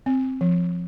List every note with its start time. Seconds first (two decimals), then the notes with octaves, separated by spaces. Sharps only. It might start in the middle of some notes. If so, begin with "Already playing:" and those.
0.06 C4
0.41 F3